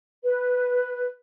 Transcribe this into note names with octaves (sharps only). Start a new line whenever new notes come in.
B4